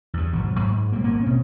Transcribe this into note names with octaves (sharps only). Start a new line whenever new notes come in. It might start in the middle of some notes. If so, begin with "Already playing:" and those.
E2 G2
G#1 B2 F#3
G#2
A#2 G3 A#3
G#1 A#3 B3
B2 C4 C#4